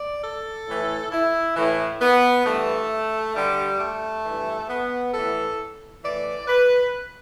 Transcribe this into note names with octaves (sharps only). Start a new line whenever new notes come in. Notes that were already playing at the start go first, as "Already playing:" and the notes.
Already playing: D5
A4
A2 E3
E4
A2 E3
B3
G2 E3 A3
G2 D3 G3
A3
G2 E3
B3
A2 E3 A4
A2 E3 D5
B4